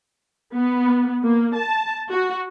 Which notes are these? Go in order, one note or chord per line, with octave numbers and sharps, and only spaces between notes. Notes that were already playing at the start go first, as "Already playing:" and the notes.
B3
A#3
A5
F#4